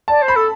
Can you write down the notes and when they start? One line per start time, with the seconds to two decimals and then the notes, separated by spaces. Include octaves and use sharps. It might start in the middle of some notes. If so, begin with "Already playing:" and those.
0.08 D5 A5
0.21 C5
0.28 B5
0.35 A4